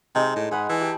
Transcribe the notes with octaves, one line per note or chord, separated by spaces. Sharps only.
C3 G#3 D#4
A2
G#2 G#4 F#5 B5
E3 A5
G4